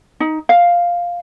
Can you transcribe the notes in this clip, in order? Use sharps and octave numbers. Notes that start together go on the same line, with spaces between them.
D#4
F5